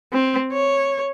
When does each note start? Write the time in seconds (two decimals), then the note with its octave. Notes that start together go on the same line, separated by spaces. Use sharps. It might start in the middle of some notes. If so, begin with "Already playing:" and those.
0.12 C4
0.52 C#5